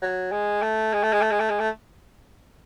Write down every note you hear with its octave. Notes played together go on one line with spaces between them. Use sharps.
F#3
G#3
A3
G#3
A3
G#3
A3
G#3
A3
G#3
A3